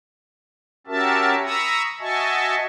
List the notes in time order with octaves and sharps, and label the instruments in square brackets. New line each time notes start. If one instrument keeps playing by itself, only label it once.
[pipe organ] C#4 F#4 G4 A#4 E5 A5
A#5 B5 C#6 D#6 E6
F#4 D#5 E5 G#5 A5 C#6